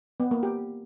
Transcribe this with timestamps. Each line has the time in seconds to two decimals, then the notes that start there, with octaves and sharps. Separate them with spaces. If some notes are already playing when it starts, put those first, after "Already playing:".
0.20 B3
0.31 A#3
0.43 G4